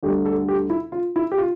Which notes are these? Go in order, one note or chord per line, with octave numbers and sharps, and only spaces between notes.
D2 D3 G3 G4
A4
G4
E4
F4
E4
G4
F4